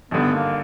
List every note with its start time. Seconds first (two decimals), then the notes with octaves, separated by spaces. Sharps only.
0.11 G#1 G2 D3 B3
0.34 A#3